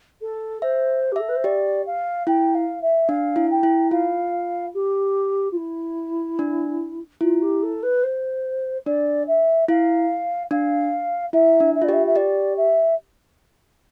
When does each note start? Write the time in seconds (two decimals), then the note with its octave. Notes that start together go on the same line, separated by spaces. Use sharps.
0.21 A4
0.62 C5 E5
1.11 G4
1.16 E5
1.19 A4
1.28 B4
1.35 C5
1.44 G4 D5
1.86 F5
2.27 E4 G5
2.54 F5
2.81 E5
3.09 D4 F5
3.36 E4
3.50 G5
3.63 E4
3.91 F4 F5
4.74 G4
5.51 F4
5.56 E4
6.39 D4
7.21 E4 F4
7.42 G4
7.62 A4
7.82 B4
8.03 C5
8.86 D4 D5
9.27 E5
9.69 E4 F5
10.51 D4 F5
11.33 E4 E5
11.60 D4
11.75 E5
11.82 F4 D5
11.89 G4
11.93 E5
12.06 E5
12.16 G4 D5
12.57 E5